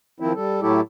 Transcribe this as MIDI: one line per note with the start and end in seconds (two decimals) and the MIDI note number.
0.20 0.33 51
0.20 0.33 53
0.20 0.33 60
0.20 0.33 64
0.35 0.61 55
0.35 0.61 69
0.62 0.81 45
0.62 0.81 54
0.62 0.81 57
0.62 0.81 64
0.62 0.81 67
0.62 0.81 69